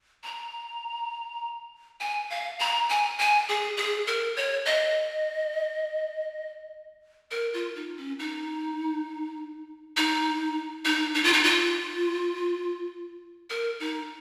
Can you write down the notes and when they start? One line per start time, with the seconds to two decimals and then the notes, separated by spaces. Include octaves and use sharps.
0.24 A#5
2.00 G#5
2.30 F5
2.59 A#5
2.89 G#5
3.19 G#5
3.48 G#4
3.77 G#4
4.07 A#4
4.36 C#5
4.66 D#5
7.31 A#4
7.54 F4
7.75 D#4
7.97 C#4
8.19 D#4
9.97 D#4
10.85 D#4
11.14 D#4
11.24 F4
11.33 D#4
11.44 F4
13.50 A#4
13.80 D#4